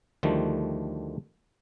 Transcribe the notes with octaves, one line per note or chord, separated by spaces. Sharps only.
D2 D#3 F3 G3 A3